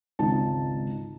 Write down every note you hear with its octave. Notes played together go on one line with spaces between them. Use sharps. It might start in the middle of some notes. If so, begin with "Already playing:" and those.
G#1 C#2 D#4 A5